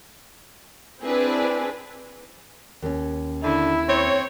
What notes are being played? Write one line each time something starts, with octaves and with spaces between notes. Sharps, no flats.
C4 D4 E4 G#4 B4
D#2 C#4
D3 E4
C4 C#5